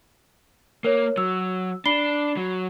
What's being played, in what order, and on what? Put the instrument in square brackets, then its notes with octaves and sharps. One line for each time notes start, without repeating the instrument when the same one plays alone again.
[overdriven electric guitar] A#3 [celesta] A#4 C#5
[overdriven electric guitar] F#3 [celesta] E6
[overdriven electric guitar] D4 [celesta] B5 C7 G7
[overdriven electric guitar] F#3